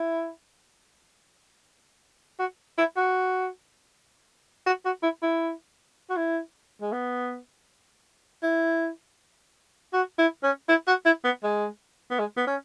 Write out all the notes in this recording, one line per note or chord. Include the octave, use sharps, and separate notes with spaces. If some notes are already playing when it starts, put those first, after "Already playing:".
Already playing: E4
F#4
E4
F#4
F#4
F#4
E4
E4
F#4
E4
G#3
B3
E4
F#4
E4
C#4
E4
F#4
E4
B3
G#3
B3
G#3
B3
C#4